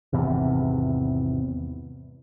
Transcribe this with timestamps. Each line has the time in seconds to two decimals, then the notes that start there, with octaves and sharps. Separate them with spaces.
0.13 G#1 E2 C3